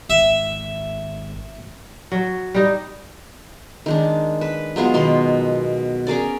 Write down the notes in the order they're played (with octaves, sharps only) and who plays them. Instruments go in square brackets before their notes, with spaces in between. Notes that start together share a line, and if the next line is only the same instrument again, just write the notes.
[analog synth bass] G#1 [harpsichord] E5
[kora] F#3
G3 D#4
[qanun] D#3 G#3 D4
B4
F#3 G#3 B3 F4
B2 D#3 C6
C#4 G#4 A#4 D5